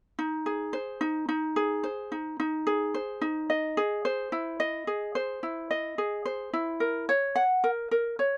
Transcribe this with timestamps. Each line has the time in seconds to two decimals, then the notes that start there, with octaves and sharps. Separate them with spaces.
0.19 D#4
0.46 G#4
0.73 C5
1.01 D#4
1.29 D#4
1.56 G#4
1.83 C5
2.12 D#4
2.40 D#4
2.67 G#4
2.94 C5
3.21 D#4
3.50 D#5
3.77 G#4
4.05 C5
4.32 E4
4.60 D#5
4.87 G#4
5.15 C5
5.43 E4
5.71 D#5
5.98 G#4
6.25 C5
6.53 E4
6.80 A#4
7.09 C#5
7.36 F#5
7.64 A#4
7.91 A#4
8.19 C#5